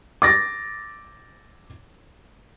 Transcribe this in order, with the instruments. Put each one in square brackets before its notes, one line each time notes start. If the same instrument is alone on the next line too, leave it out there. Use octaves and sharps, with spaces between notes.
[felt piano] D6 A6 A#6